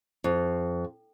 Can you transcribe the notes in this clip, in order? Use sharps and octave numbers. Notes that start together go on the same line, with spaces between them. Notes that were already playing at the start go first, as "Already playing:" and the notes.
F2